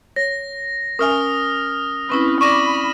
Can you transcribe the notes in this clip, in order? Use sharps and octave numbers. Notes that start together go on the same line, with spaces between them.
C#5 A#6
C#4 A#4 E5 G#5 D#6 F6
C4 C#4 E4 B4
D5 B5 C#6 D6 A#6 D#7 E7